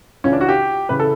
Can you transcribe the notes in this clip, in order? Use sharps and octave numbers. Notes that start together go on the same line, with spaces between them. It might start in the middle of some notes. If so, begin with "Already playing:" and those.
C#2 C#3 E3 C#4
D4
F#4
G4
C#3 E3 B4
A4